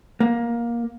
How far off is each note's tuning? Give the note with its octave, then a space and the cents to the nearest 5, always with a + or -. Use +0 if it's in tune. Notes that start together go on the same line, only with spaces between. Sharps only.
A#3 +15